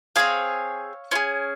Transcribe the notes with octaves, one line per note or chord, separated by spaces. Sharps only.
C4 F4 G#4 C#5 F5
C#4 F4 G#4